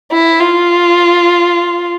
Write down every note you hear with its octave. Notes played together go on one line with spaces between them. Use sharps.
E4
F4